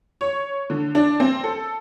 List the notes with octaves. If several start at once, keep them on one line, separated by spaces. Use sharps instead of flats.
C#5
D3
D4
C4
A4